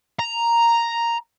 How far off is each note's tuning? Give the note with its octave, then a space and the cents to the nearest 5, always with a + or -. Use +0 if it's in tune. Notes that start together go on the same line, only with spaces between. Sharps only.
A#5 +0